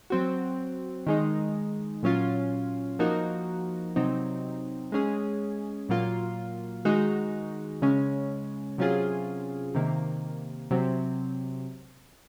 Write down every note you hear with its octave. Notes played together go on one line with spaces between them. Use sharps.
F#3 C4 F#4
D#3 G#3 D#4
A#2 F#3 C#4 F4
F3 A#3 D#4 F#4 A#4
C3 F#3 C4 D#4
G#3 C#4 G#4
A#2 F#3 A#3 F4
D#3 G#3 D#4 F#4
C#3 G#3 C#4
C3 F#3 C#4 F4 G#4
C3 D#3 A#3
C3 F#3 C4